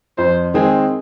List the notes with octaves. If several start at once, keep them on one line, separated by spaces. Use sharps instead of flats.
F2 C5
D#3 G#3 C4 G#4